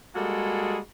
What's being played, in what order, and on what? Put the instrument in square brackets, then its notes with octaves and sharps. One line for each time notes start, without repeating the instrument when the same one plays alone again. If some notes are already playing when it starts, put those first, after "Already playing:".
[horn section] G3 G#3 A#3 F#4 G#4 A4